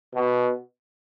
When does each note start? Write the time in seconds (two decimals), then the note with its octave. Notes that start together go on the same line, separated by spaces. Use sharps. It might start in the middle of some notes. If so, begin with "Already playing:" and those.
0.15 B2